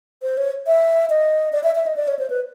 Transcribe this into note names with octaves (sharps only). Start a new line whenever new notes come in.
C5
C#5
E5
D#5
D5
E5
E5
D#5
D5
C#5
C5
B4